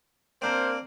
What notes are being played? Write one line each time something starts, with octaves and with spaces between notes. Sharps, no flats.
A#3 C4 D4 A#4 C5